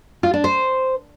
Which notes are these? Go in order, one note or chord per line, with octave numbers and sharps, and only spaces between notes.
F4
D4
C5